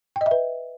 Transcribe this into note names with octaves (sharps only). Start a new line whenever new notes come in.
G5
D#5
E5
B4